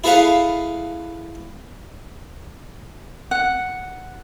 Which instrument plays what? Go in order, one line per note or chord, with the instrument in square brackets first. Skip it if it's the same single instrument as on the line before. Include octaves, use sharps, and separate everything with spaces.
[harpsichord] E4 G#4 A4 B4 F5
[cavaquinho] F#5